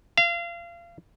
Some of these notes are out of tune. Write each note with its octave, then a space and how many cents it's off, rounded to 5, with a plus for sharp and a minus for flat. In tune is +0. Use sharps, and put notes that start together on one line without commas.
F5 -30